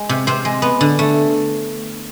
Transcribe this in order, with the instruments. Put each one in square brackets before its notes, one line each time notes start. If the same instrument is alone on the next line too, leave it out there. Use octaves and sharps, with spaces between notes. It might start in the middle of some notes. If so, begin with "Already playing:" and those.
Already playing: [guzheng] G#3
C3
C3 C5
G#3
B3
D3
A3